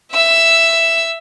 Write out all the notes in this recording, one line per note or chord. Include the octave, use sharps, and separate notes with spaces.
E5 E6